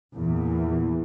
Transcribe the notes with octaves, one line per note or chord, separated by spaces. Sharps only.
E2 A#2 E3